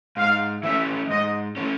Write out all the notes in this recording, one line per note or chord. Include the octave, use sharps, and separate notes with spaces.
G#2 F5
E3 A3 C#4 E5
G#2 D#5
E3 A3 C#4